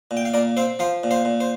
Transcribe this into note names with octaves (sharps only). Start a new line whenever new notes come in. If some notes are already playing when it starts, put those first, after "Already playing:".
A#2
G5
F5
A#2 A#4 D5
C4 C5 F5
F3 C5 F5
A#2
C5 F5
A#2
C5